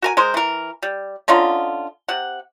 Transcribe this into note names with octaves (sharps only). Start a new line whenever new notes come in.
F#4 A#4 G#5
G#3 A#4 C5
E3 A#4
G3
D3 C#4 D#4 F4
C3 F#5